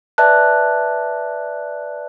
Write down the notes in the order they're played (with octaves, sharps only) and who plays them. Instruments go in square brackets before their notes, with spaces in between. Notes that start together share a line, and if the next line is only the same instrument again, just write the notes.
[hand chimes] B4 D5 E5 A5 F#6